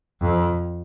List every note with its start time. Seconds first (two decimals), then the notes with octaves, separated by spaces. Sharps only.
0.21 F2